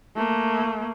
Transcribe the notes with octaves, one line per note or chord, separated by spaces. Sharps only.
A3 A#3